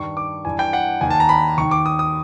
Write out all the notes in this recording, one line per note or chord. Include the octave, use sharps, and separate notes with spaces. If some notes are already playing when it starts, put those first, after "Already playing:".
Already playing: G2 D#3 C#6
D6
G2 E3 G#5
G5
F#5
D#2 D#3 G#5
A5
A#5
B5
D#2 D#3 C#6
D6
D#6
D#6